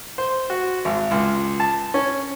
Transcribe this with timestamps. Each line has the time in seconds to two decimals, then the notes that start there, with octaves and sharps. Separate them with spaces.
0.18 C5
0.50 F#4
0.85 G#1
1.11 C#2
1.60 A5
1.94 C#4